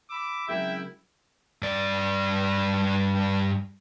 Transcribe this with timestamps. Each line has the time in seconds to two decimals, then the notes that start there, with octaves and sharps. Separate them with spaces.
0.10 B5 D6 E6
0.48 C#3 F#3 G#3 C4 E4 A#4 E5 G5
1.62 G2 D5